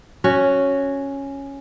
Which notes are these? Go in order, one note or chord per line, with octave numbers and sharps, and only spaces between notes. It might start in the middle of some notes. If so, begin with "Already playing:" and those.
C#4 F#4